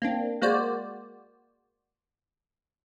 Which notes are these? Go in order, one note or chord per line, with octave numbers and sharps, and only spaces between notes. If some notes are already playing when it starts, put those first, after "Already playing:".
A#3 C4 D4
G#3 A#3 F#4 C5 D5